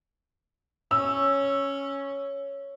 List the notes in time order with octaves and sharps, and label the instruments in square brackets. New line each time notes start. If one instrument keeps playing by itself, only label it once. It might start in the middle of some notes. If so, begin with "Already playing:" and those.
[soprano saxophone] C#4 [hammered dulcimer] C#5 [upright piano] E6